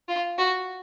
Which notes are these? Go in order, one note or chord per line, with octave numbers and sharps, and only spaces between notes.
F4
F#4